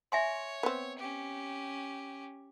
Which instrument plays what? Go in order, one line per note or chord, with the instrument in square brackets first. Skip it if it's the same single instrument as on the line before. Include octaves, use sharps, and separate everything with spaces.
[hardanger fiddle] C#5 [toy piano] E5 G#5 C6
[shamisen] B3 C4
[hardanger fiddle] C#4 G4